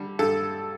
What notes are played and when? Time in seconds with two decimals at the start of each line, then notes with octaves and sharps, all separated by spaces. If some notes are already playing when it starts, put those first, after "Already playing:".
Already playing: D3 G3
0.19 G2 A4